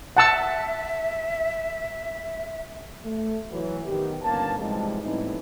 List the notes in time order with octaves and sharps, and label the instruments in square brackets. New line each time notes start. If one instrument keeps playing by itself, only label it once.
[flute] E5 [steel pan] F#5 A5 E6
[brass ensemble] A3
E3 F#3
D#3 B3 G4
G1 A#3 B3 C#4 A5
G#2 C3 E3 F3 G3 G#3
A2 E3 G3 B3 C4 D#4